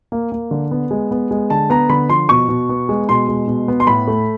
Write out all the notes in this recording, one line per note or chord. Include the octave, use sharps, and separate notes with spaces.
A#3
A#3
D3
B3
G#3
B3
G#3
D3 A5
B3 A#5
D3 B5
F3 C6
B2 C#6
B2
B3
G#3
B2 C6
G#3
B2
B3
C6
A2 B5
A3